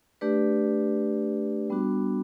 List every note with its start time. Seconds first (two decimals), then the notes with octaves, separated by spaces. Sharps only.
0.21 A3 D4 G4 B4 D5
1.70 G3 B3 D4 F#4